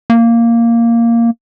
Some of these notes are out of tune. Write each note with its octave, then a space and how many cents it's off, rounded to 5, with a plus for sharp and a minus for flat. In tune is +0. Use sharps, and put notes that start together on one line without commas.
A#3 -5